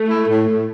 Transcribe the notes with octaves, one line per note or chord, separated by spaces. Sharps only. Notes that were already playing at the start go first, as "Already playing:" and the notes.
Already playing: A3
E4
A2
A2